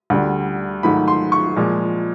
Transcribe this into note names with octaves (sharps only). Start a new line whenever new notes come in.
D2 D3 G3
G#2 D#3 F#3 A3 B5
C6
C#6
A#2 F3 G#3